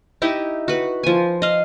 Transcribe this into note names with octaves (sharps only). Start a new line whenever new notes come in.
D#4 E4 G4 D#5
F#4 B4
F3 G#5
D#5 F5